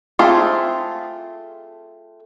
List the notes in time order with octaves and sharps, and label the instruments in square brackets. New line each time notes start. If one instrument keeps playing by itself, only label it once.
[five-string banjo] A3 C4 F4 G#4